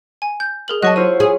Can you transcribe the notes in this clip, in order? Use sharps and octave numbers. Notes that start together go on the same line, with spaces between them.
G#5
G6
G#4 A#4 F#7
F#3 D#5 A5 C#6 F#6
E4 F4 C5 C#5 D#7
G#4